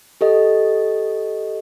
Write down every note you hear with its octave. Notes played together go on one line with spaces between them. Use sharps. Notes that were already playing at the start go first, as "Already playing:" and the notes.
G4 A4 D#5